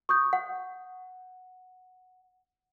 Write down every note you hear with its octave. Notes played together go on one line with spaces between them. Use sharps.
C#6 D#6 G6
F#5